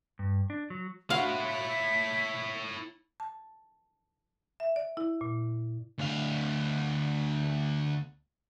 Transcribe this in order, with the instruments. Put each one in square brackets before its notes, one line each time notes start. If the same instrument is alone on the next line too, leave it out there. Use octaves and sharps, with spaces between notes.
[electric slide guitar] G2
D4
F#3
[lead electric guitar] E4 C#5 [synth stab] F#4 F#6 [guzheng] F5 [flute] C6
[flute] B6
[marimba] A5
E5
D5
E4
A#2
[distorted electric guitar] D2 F5